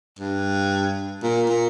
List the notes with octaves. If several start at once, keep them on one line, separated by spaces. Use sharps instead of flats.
G2
A#2
A#2